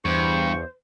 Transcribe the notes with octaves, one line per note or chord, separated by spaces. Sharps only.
E2 G2 C5 C#6